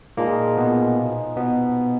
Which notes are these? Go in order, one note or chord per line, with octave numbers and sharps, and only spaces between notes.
A#2 F3 G#3 A#3 D#4
B2 B3
B2 B3